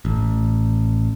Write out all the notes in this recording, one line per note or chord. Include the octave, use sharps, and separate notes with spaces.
A1